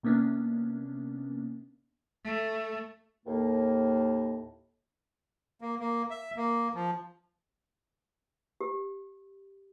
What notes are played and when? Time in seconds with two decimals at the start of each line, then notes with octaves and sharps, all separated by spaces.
0.03 C3 A#3 B3 C#4 D4
2.24 A3
3.26 D#2 A2 A#3
5.61 A#3
5.80 A#3
6.10 E5
6.36 A#3
6.75 F3
8.61 G4